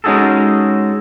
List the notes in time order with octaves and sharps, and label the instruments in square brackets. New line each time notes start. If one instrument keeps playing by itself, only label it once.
[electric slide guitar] G#3 C#4 D#4 F#4 G#4 A4